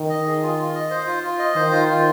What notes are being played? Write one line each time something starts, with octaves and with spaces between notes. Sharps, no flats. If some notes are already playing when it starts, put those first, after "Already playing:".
Already playing: D#3
D#5
G#4
F4
F4
D#5
C5
F4
F4
D#5
D#3 C5
F4
F4